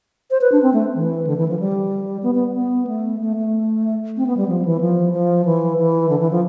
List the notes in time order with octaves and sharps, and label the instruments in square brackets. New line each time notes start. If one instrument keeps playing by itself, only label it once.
[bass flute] C5
B4
D4
C4
A3
E3
D3
E3
F3
G3
B3
B3
B3
A3
A3
A3
C4
B3
G3
F3
E3
F3
F3
E3
E3
D3
E3
F3